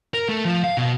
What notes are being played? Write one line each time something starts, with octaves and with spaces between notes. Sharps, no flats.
A#4
A3
F3
F5
B2